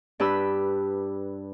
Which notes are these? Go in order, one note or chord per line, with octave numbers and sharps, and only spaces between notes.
G2 D4 G4 B4 B5 E6